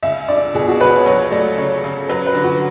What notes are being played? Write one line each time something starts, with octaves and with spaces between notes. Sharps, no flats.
C#2 E5
D4 D5
B2 G#4
F#4
C#2 B4
C#5
F#3 C#5
A3 D5
C#3 C#5
C#3
F#3 B4
B4
D3
F#4